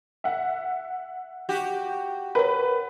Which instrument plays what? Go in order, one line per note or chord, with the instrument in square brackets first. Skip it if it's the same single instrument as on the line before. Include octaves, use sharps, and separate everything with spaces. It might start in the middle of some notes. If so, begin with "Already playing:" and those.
[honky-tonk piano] E5 F#5
[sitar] F#4 G4
[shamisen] A#4 C#5 [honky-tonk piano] B4